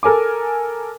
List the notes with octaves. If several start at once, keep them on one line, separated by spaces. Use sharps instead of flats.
A4 A#4 G#5 D6